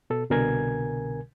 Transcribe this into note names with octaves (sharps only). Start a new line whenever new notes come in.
B2 A4
C2 B2 D3 A#4 G#5 G#6